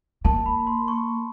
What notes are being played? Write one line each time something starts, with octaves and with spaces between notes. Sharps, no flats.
A#3 A5
B5
C6
C#6